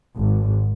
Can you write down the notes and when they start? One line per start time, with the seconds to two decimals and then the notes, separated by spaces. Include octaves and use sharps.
0.16 G#1 G#2